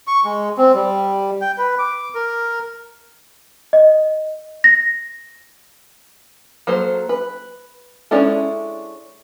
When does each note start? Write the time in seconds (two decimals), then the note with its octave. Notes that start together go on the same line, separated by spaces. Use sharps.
0.07 C#6
0.25 G#3
0.58 C4
0.74 G3
1.41 G5
1.58 B4
1.79 D6
2.15 A#4
3.73 D#5
4.64 A#6
6.67 F#3 A#3 A4 C5
7.09 B4
8.11 G#3 C#4 D4 E4 A4